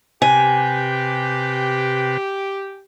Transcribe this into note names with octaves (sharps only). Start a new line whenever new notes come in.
C3 G4 B4 G#5